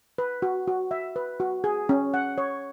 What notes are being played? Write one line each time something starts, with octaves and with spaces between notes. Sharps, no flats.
B4
F#4
F#4
E5
B4
F#4
G#4
C#4
F#5
C#5